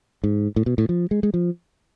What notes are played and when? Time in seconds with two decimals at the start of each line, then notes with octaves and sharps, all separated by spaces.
0.24 G#2
0.56 A2
0.66 B2
0.78 A2
0.89 F3
1.11 G#3
1.23 G#3
1.34 F3